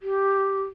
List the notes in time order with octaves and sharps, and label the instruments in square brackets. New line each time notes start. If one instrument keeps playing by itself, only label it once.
[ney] G4